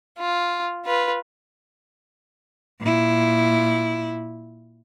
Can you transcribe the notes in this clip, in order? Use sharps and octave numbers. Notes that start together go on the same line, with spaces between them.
F4
F4 B4
A#2 E4